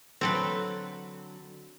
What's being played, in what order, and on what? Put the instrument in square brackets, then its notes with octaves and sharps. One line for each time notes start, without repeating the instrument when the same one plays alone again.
[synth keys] D3 F#3 [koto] C4 A4 B4